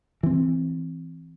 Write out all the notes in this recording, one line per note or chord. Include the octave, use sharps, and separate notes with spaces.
E3 C4